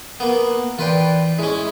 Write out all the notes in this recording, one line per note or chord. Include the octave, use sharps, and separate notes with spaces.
A#3 B3
E3 F4 B4 D5 G5
G#3 C#4 E4